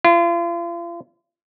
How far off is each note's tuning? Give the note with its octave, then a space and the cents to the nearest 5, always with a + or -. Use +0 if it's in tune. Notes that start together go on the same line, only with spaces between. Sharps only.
F4 -40